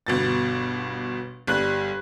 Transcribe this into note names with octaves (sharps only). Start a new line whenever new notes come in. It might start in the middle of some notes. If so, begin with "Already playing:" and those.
G1 B2 A6
G1 G3 F#6